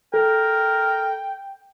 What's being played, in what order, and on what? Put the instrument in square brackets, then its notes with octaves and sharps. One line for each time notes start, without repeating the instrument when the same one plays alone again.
[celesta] A4 [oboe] A#4 [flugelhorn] G5